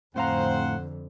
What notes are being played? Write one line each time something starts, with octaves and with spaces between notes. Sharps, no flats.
F2 A2 D3 C4 C5 F5 F#5 A#5